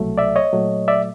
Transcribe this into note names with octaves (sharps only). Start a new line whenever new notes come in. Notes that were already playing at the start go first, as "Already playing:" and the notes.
Already playing: C2 B2 F#3 A3
D5 E5
C#5 D#5
A#2 F#3 A3
D5 E5